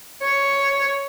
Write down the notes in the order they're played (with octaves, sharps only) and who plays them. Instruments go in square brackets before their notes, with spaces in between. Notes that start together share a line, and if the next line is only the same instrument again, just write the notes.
[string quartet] C#5